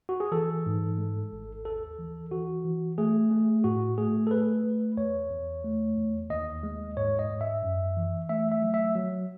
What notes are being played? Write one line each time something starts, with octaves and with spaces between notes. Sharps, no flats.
F#4
G#4
E3 A4
G#2
G#3
G#1
D#2 A4
E3
E3 F#4
E3
A3 G#4
A3
A2 F#4
A3 G#4
A4
A3 B4
A3
E2 C#5
E2
A3
E2
D#2 D#5
G#3
G#2 C#5
D#5
G#2
E5
F#2
E3
A3 E5
E5
F#3
E5
F#3